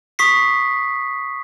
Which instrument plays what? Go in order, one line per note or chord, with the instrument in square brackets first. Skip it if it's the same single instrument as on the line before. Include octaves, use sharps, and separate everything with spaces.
[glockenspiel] C#6 D#6 B6 C7